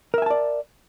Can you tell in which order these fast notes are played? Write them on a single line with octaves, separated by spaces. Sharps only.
A#4 E5 G#5 A5 D5